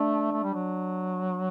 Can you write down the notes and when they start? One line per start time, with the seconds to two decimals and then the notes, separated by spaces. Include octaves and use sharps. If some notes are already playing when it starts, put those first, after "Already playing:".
Already playing: A3 D4
0.32 A3
0.43 G3
0.54 F#3